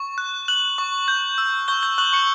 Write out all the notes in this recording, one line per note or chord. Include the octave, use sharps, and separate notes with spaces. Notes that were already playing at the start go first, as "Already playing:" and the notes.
Already playing: C#6
F#6
F#6 F#7
C#6
G6
E6
C#6 G6 G7
G6 G7
C#6 F#6 F#7
C#6 C#7